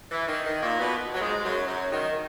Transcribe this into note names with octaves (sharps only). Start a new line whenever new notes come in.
E3
D#3
D#3
A#2 A#3
B2 B3
F#3
G#2 G#3
F#2 F#3
F#2 F#3
D#3